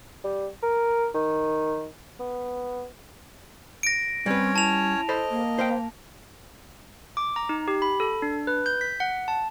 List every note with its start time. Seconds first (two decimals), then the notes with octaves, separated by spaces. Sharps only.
0.24 G3
0.63 A#4
1.15 D#3
2.19 B3
3.83 A#6 D7
4.26 G3 C4 C#4 B4 C#5
4.56 E4 A5 F7
5.09 A4 C5 D#5 B5
5.30 A#3
5.59 C5 F5 G5
7.17 D6
7.36 A#5
7.49 D#4
7.68 G4
7.82 B5
8.00 A4
8.22 D4
8.47 B4
8.66 G6
8.81 B6
9.00 F#5
9.28 A5